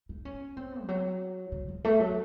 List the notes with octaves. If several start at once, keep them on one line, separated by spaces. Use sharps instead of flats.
D#4
C#4
C4
F3
F#3
D#3
F3
A3
F#3